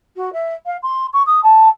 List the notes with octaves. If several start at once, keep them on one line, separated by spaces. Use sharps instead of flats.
F#4
E5
F5
C6
C#6
D#6
A5